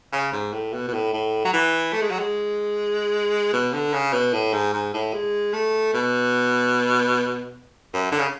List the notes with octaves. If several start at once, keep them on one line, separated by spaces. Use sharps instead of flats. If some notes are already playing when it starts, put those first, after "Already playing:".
C#3
G#2
A2
B2
B2
A2
A2
F#3
E3
A3
G#3
F#3
G#3
B2
D3
C#3
B2
A2
G#2
G#2
A2
G#3
A3
B2
F#2
D3
C#3